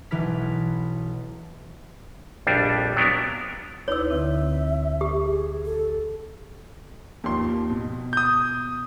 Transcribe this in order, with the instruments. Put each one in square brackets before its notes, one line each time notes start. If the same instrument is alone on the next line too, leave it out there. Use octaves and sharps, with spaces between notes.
[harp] B1 E3 B4 F6 B6
[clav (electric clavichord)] A#1 F2 G3 D4
F#3 B3 D4 A#4
[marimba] D2 D#4 E4 [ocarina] B4 [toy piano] C#5 E6
[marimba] D2 D3 C4 [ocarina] E5
[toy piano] G4
[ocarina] G#4
A4
[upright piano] D#2 F3 C6
B2
[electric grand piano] D#6 G6